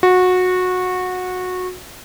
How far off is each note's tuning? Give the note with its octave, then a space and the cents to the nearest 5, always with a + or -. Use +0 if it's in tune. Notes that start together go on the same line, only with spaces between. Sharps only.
F#4 -20